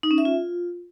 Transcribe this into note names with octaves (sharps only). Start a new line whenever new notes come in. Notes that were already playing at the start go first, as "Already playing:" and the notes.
D#4
C#4
E5
F4